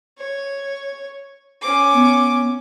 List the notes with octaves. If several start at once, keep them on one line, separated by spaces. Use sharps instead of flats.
C#5
C#4 D6
B3